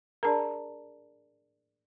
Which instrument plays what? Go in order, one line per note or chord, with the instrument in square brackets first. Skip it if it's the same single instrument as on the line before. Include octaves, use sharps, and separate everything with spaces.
[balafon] D4 G#4 A#4 [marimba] D5 A5 A#5